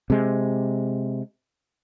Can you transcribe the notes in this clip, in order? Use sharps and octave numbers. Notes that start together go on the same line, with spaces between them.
C3 G#3